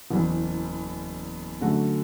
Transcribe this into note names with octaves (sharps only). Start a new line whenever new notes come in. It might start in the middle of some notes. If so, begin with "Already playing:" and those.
F#1 E2 E3
F#2 D3 A3 F#4